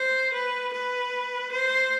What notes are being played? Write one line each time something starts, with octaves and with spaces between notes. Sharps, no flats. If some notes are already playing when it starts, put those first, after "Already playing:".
Already playing: C5
B4
B4
C5